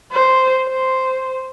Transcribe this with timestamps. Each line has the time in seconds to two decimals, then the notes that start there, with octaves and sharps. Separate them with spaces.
0.12 C5
0.68 C5